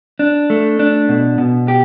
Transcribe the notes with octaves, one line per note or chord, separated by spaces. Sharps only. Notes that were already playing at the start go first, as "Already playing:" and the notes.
D4
A3
D4
B2
B2
G4